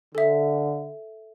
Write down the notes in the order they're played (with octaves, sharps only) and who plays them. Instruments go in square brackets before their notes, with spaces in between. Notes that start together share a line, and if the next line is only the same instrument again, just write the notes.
[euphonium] D3 [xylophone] A4 E5